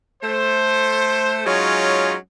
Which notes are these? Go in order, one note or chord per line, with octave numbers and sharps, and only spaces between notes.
A3 C5
F#3 G#3 C#4 D#4 F4